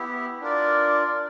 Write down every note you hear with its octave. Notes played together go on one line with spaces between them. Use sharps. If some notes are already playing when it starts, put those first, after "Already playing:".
Already playing: B3 E4 G4
D4 F4 A#4 D5